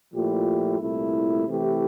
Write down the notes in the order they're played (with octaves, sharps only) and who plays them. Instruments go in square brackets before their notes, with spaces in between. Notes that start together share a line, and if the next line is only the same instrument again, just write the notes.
[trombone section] A#2 F3 A3 E4 G4
C2 A#2 A3 E4
C3 E3 A3 E4 G4